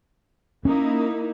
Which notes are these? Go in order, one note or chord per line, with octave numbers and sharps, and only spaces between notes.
A#3 C#4 D#4 E4